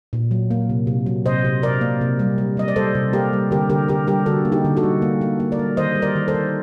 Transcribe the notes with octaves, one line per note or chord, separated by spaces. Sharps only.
A#2
F#3
A#3
C3
C3
F#3
C3 C5 D#5
C3
C3 A#4 D5
A#3
C3
G3
G3
G3 D#5
D5
G3 A4 C5
C3
A#3 G4 A#4
G3
D3 G4 A#4
D3 G4 A#4
D3 G4 A#4
G3 G4 A#4
D3 F#4 A4
A#3
D#4 G4
D3
F#4 A4
G3
A#3
A#3
A#3
A#4 D5
G3
D#3 C5 D#5
G3
A#4 D5
D#3
A4 C5
D#3